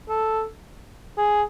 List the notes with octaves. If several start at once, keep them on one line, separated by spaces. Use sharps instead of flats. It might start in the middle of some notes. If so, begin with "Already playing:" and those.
A4
G#4